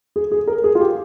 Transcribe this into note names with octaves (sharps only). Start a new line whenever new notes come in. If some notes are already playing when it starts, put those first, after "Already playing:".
G#4
G#4
A#4
G#4
F4
G4